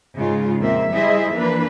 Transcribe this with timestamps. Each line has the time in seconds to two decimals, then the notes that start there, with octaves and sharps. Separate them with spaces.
0.17 G#2 C#3 G#3 F4
0.59 F2 A#2 A#3 C4 E5
0.92 G3 E4 G#4 C5 D#5 E5
1.32 E3 F3 A#3 D4 B4